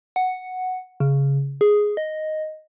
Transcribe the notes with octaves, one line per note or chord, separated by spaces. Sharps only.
F#5
C#3
G#4
D#5